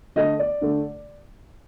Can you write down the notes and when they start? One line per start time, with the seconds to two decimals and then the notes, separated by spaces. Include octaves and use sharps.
0.16 D3 A3 D#5
0.39 D5
0.61 D3 A3